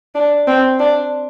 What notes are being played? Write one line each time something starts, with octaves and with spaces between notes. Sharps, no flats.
D4
C4
D4